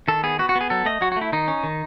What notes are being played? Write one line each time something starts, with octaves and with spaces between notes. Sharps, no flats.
D#3 A4
B3 G#4
B3 F#4
F#4
B3
G#4
F#3 A4
A3 D#5
F#3 F#4
F#4
A3
E4
D#3 D#4
C#4
D#3